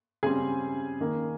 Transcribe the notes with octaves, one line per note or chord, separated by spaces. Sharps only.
C#3 G3 C4 G#4 G#5
D#3 A#3